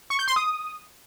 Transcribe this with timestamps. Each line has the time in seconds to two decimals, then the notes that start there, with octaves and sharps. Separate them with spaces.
0.10 C#6
0.19 G6
0.28 C6
0.36 D#6